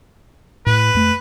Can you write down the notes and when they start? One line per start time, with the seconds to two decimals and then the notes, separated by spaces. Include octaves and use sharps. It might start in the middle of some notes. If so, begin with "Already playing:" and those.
0.66 A2 B4
0.95 F2 A3